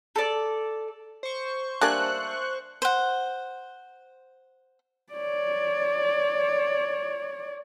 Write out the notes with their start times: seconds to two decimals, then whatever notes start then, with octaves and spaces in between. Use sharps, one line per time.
0.16 A4 D5
1.23 C5 C#6
1.81 G3 A3 A#3 D4 G#5 A5 F#6
2.82 C5 F#5
5.12 C#5 D5